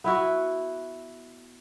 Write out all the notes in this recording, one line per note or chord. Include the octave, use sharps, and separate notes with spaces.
B3 E4 F#4